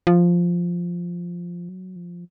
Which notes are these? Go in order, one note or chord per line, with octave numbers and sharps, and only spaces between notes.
F3
F#3
F3